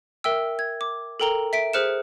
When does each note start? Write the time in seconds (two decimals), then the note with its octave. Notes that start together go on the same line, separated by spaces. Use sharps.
0.24 A#4 E5 G5 E6
0.59 G#6
0.81 D6
1.20 A4 A#4 G5 A#5 G7
1.53 E5 B6 D7
1.73 G#4 C5 F6 F#6 C#7 E7